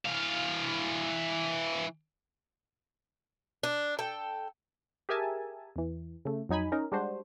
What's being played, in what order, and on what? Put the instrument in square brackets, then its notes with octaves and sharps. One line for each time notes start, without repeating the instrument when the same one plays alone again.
[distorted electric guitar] E3 F5
[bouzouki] D4
A4 G5
[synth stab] G4 G#4 A#4 E5 G#5 A5
E2 E3
C#3 A3
F2 F#3 D#4 G#5 B5
C#4 D#4 A#4
G3 G#3 D4 F#4 C5